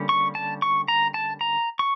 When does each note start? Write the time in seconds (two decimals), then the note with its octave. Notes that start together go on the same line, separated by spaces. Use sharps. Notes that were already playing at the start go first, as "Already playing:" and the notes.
Already playing: D3 G3 A#3 C#4
0.09 C#6
0.35 A5
0.62 C#6
0.88 A#5
1.14 A5
1.41 A#5
1.79 C#6